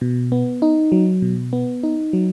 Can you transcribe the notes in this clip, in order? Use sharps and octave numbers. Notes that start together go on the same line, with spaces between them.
B2
B3
D#4
F#3
B2
B3
D#4
F#3